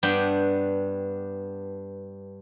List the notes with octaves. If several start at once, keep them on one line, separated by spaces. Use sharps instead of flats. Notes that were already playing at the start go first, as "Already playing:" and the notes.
G2 B3 D4 F#5 G5